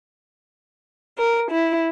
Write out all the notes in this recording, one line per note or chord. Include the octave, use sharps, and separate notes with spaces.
A#4
E4